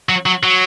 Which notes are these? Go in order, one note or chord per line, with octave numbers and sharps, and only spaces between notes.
F#3
F#3
F#3